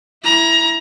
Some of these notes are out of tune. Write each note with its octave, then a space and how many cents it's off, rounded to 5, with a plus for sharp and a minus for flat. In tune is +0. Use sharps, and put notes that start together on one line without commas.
E4 +5 A#5 +25